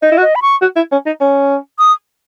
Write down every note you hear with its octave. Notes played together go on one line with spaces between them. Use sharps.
D#4 D#5
E4
F#4
D#5
B5
C#6
F#4
E4
C#4
D#4
C#4
D#6